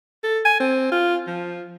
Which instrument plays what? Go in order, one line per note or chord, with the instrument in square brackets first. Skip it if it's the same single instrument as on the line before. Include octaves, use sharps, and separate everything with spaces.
[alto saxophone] A4
G#5
C4
F4
F3